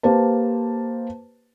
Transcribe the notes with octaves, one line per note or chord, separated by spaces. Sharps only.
A#3 G4 B4 C5 A5